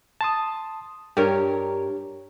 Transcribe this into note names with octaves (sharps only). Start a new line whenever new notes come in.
A5 C6 D#6
G2 G4 A#4 C#5